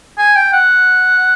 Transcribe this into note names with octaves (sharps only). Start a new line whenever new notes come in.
G#5
G5
F#5